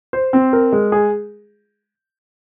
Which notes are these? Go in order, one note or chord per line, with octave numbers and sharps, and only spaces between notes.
C5
C4
A#4
G#3
G#4